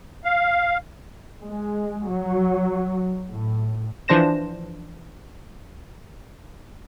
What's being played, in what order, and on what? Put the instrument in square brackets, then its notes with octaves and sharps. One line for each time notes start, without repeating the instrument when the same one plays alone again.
[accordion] F5
[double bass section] G#3
F#3
A2
[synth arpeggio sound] E3 F3 D4 C5 A#6 E7